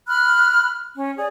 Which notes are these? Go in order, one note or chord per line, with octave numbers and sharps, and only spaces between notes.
B5 F6 F#6
C#4
G#4 D5